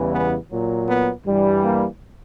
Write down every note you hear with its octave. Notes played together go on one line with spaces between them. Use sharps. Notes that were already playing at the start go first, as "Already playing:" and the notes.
Already playing: E2 C#3 E3 G3
B3
A#2 F#3
B3
G2 E3 G3
A#3